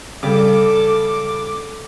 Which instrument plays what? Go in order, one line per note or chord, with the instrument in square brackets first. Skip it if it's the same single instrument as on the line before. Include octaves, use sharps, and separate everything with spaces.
[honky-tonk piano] C#3 G3 [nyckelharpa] A4 [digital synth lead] D6